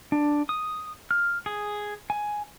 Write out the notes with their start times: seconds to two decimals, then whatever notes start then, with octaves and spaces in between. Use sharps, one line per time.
0.12 D4
0.49 D#6
1.11 F6
1.46 G#4
2.10 G#5